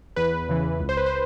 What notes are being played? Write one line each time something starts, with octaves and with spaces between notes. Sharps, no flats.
E2 B4
C#3 E3
C#2
C5
B4
C5